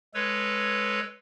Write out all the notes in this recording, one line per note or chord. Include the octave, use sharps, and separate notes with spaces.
G#3 A4 B4 C#5